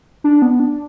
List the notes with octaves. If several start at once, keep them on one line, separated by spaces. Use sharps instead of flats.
D4
B3
D4